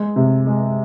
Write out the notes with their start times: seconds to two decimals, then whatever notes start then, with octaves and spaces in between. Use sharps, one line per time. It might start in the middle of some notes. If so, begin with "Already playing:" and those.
Already playing: G#3
0.16 C3
0.47 G#3